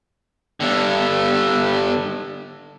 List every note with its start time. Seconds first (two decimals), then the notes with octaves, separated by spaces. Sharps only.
0.60 G2 D3